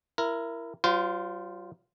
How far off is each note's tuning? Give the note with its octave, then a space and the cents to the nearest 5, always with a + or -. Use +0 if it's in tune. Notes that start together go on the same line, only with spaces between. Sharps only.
E4 +25 A#4 +0
F#3 +45 F4 +0 C5 -30